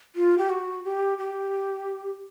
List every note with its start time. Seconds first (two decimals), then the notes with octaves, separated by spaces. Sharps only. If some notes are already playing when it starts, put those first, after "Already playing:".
0.16 F4
0.38 G4
0.50 F#4
0.84 G4
1.18 G4